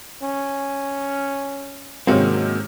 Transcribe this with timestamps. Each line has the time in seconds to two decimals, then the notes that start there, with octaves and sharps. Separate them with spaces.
0.23 C#4
2.07 G#2 C3 D#3 G#3 A#3 C4 C#4 F#4